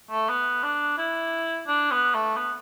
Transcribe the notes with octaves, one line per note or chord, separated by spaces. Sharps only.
A3
B3
D4
E4
D4
B3
A3
B3